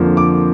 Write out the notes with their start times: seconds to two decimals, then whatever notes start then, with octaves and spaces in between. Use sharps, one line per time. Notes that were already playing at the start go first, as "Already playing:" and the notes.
Already playing: F2 D3 F3 A#3
0.17 D6